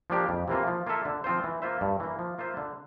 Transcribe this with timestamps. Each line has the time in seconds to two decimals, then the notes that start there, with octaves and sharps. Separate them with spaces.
0.10 F3 A#3 D4 G4
0.29 F2
0.48 C3 E3 A#3 F4
0.67 F3
0.87 A#3 F4 A4 E5
1.05 D3
1.24 F3 C4 F4 C5
1.44 E3
1.62 A#3 F4 C5 E5
1.81 G2
2.00 E3 A#3
2.19 F3
2.38 A#3 F4 C5 E5
2.57 D3